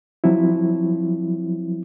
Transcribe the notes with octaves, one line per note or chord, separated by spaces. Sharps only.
F3 F#3 C4 E4